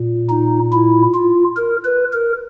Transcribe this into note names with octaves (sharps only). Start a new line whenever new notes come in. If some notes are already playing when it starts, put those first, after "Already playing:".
Already playing: A#2
D#4
E4
F4
A#4
B4
A#4